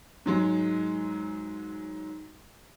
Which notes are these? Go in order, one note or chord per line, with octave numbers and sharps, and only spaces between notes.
G#2 F#3 G#3